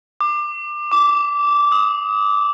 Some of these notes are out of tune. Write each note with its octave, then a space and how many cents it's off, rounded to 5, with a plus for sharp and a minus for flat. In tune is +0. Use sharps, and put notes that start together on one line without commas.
D6 +25
D6 -15
D#6 +30